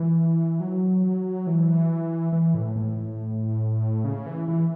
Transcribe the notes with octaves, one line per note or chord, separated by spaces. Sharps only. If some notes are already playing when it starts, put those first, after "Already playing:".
Already playing: E3
F#3
E3
E3
A2
A2
A2
C#3
E3
E3